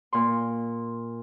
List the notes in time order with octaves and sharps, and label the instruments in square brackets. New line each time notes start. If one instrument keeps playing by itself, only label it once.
[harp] A#2 C6